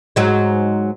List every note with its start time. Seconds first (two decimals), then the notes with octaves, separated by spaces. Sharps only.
0.16 G#2 F#3 G#3